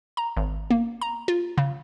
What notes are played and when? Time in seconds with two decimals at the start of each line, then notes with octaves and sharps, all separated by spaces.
0.17 A#5
0.37 G#1
0.70 A#3
1.01 A#5
1.28 F4
1.58 C#3